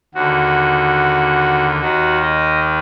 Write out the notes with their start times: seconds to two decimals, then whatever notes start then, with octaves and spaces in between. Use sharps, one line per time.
0.14 D#2 D3 F#4
1.80 D#2 D#3 F#4
2.22 D#5